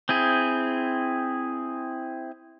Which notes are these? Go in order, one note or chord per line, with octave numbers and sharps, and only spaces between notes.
C4 E4 G#4